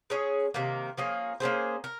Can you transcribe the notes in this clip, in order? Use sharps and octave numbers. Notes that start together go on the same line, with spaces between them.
G#3 C#4 G#4 C#5
C3 D#3 A#3
F3 A#3 C#4 G#4
A#3 C#4 G#4 C5
A#4